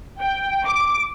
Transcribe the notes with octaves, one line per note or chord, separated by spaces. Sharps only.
G5
D6